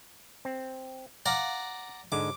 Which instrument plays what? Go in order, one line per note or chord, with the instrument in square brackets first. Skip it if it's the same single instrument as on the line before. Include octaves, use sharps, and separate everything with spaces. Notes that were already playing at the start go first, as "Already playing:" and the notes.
[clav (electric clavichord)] C4
[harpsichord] D5 F#5 A#5 [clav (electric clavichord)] F5
[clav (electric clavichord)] G#2 D3 G#3 [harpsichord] D6